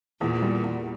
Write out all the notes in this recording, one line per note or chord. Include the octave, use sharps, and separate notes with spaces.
E2 A#2
G3
E2